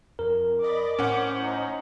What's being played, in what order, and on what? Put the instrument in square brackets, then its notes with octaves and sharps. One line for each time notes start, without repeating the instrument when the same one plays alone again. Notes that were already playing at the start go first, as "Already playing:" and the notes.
[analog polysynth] F2 [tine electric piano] A#4
[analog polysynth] D5 D#5 B5 [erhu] D6
[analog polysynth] A2 C5 [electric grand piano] C#4 F#5
[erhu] D#4